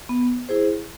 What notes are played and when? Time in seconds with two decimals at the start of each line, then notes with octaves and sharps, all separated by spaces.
0.09 B3
0.49 E4 G#4 C5